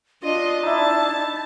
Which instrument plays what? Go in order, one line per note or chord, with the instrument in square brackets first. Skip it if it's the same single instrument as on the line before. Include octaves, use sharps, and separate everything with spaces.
[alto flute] D4 [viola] F4 D#5
[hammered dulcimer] D#4 E4 [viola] A5